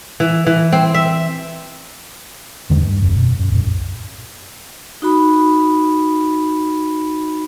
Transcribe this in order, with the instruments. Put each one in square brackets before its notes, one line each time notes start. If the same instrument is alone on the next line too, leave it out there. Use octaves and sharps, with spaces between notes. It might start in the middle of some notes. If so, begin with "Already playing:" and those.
[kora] E3
E3
C4
E5
[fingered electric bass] E2 D3 D#3 G#3
G2
D#1 F#2
B2
F#2
B1 F#2 A#2
[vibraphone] D#4 F#4 B5